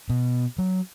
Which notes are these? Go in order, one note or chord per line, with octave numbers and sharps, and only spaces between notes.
B2
F#3